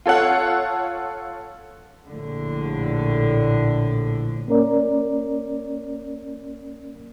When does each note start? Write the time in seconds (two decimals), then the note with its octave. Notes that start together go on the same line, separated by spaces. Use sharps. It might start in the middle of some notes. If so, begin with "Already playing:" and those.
0.06 F4 A4 C#5 F#5
2.09 A#1 A2 D3
4.48 A#3 C#4 A#4 D5